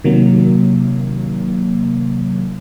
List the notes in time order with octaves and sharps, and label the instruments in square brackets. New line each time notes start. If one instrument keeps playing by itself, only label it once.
[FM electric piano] C3 D#3 F#3 A#3